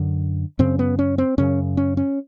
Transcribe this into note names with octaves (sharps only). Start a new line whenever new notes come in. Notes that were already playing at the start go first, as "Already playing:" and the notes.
Already playing: F#2 D3
F#2 C#3 C4
B3
C#4
C4
F#2 C#3 C#4
C#4
C#4